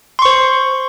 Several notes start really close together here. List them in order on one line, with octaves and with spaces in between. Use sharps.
C6 C#6 C5